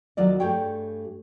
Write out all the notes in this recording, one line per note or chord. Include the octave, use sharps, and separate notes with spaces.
D#2 F#3 F4 D5 D#5
G2 A3 G4 G#4 C#5 G5